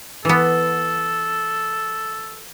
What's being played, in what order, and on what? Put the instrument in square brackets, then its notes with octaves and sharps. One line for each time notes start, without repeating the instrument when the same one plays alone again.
[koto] E3 B3 [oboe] A4